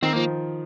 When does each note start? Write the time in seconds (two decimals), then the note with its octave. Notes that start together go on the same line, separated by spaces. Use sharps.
0.02 D#3 C4
0.13 F3 A#3